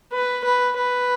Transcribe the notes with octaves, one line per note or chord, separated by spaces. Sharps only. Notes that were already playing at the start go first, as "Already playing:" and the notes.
B4
B4
B4